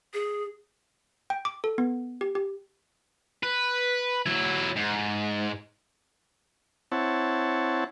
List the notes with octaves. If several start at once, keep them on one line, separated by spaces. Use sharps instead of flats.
G#4
G5
D6
A4
B3
G4
G4
B4
F#3 E4
G#2
C4 E4 C#5 F#5 A5